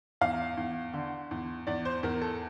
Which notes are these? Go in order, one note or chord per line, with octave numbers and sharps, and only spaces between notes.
E2 F5
E2
D3
E2
E2 D5
C5
E2 A#4
A4